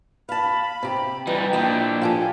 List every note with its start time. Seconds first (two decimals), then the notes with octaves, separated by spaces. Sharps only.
0.29 F5 A5 B5
0.83 C3 G4
1.27 E3 G3 D#4 G5
1.53 A#2 D4 E4 D#5 G5
2.01 F3 G4 A4 G#5